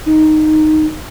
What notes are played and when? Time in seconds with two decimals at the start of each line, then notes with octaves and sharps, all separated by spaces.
0.06 D#4